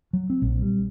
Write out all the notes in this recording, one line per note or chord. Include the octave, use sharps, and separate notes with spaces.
F#3
C4
A#1
G3